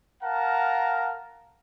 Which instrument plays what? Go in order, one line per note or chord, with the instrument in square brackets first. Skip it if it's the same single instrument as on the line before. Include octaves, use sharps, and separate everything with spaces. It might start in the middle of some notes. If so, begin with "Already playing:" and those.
[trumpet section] A#4 F5 F#5 A5 A#5